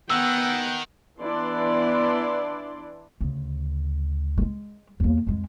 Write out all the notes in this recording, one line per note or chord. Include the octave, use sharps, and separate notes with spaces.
D#3 B3 F#5 G5 E6
E3 B3 D4 E4 D5 C6
D2 C#3
G#3 A3
E2 A#3
F2 G#3